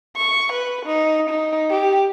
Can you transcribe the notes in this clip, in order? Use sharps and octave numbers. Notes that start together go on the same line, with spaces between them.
C#6
B4
D#4
D#4
G4